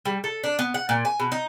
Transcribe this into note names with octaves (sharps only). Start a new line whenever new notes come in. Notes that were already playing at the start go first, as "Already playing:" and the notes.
G3
A4
D4
B3
F#5
A#2
G#5
B2
D#4